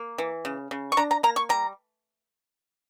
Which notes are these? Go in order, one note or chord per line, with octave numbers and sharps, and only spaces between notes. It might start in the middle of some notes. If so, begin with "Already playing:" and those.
Already playing: A#3
E3
C#3
C#3
C#6
D4 A#5
A#5
A#3 A#5
C#6
G3 A#5